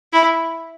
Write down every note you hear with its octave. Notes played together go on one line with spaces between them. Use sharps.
E4